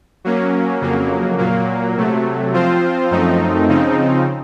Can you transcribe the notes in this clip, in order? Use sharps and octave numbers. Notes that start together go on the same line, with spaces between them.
F#3 A#3 C#4
F2 C#3 F#3 A#3
A#2 F#3 A#3
C3 F#3 A3
F3 C4 F4 C5
F#2 F3 A3 C4 D#4
C#3 F3 C4 D#4